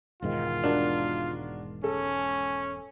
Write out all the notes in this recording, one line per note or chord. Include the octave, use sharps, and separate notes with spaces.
E1 G#2 D#3 F4
D4 F#4 A#4
C#4 A4